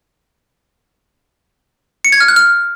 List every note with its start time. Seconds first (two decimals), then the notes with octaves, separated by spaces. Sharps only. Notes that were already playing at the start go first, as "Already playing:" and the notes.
2.05 C#7
2.12 G#6
2.20 F6
2.28 F#6
2.36 F6